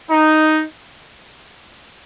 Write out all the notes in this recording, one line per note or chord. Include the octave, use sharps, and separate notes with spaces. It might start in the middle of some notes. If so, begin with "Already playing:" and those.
D#4